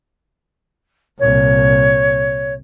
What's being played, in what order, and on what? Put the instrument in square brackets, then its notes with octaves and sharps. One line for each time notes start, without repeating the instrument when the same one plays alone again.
[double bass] C2 A#2 [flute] C#5